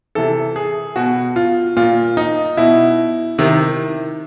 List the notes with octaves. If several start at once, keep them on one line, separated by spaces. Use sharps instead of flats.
C3 E3 A4
G#4
B2 F#4
F4
A#2 F4
D#4
B2 E4
C3 D#3